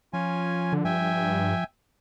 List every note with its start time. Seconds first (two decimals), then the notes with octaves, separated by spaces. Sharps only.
0.13 F3 C#4 F4 G#5
0.72 D3
0.85 G2 E5 G5 G#5